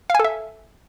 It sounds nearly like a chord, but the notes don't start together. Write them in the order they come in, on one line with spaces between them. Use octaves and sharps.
F5 G#5 A4 E5